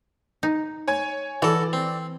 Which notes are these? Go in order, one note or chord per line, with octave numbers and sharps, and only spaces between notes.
D#4
C#5 G#5 G#6
E3 F#4 A4 D5
C4